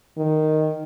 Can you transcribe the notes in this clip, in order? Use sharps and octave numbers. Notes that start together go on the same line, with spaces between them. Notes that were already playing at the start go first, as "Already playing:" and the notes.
D#3